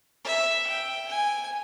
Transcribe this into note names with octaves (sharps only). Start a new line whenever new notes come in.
E5
G5
G#5